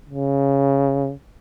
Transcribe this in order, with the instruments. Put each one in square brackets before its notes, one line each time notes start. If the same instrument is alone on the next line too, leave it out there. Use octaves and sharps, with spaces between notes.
[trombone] C#3